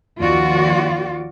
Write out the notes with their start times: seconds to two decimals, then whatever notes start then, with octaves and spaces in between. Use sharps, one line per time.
0.20 D#2 F3 F4 F#4 D5